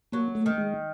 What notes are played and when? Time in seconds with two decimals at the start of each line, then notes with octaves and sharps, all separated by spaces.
0.12 F#3 A#3
0.35 A3
0.46 D#3
0.58 G#3